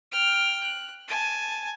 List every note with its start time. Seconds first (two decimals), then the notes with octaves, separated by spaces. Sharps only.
0.12 G5 F6
0.63 F#6
1.08 G#5 A5